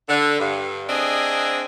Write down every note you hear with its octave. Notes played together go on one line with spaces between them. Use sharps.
D3
G2
C4 D4 G#4 D#5 E5